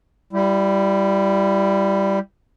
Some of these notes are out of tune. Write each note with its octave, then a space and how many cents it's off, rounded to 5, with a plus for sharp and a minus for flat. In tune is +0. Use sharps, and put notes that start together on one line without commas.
G3 +0 E4 +30